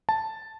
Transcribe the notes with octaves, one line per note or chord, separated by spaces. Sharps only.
A5